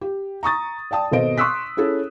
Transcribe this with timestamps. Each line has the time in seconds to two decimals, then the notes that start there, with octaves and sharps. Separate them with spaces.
0.01 G4
0.43 A#5 C#6 D#6 A6
0.91 D5 G5 A5 D#6
1.11 G#1 B2 A4 C5 D#5 D7
1.38 C6 C#6 D#6 E6 F#6 B6
1.77 C#4 E4 G#4 A4